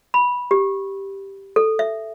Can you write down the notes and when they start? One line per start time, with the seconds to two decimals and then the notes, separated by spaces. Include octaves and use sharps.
0.14 B5
0.51 G4
1.56 A4
1.79 E5